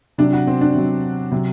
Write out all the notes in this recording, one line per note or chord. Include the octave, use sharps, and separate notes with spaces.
C3 F#3 D4
F#4
C4
D4
C3 F#3
C3 F#3